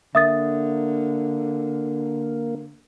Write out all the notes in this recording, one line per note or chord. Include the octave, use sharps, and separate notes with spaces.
D3 A#3 E5 D#6 A6